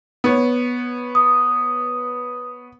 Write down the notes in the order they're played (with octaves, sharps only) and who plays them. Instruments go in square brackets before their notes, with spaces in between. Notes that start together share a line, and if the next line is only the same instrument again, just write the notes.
[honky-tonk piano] B3 C#5
[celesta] D#6